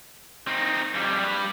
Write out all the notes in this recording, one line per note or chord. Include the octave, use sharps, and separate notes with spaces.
C4 D#4
F2 G3
G3 B4